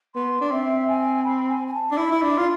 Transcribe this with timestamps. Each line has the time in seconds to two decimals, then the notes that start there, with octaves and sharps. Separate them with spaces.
0.15 B3 C6
0.41 D4
0.51 C4 E5
0.88 G#5
1.25 B5
1.49 G#5
1.67 G#5
1.74 A5
1.91 D4
1.97 E4 B5
2.12 E4
2.22 D4
2.35 F4 C6